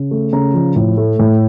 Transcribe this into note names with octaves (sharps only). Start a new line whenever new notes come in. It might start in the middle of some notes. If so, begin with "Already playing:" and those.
Already playing: C#3
A3
C#3 A#5
F3
A2
A3
A2